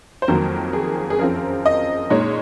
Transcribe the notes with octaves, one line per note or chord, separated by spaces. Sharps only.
C5
F2 D#3 F#3 A#3 A#4
G#4
G#4
F#2 F3 C4 A#4
D#5
A#2 G#3 D#4 C#5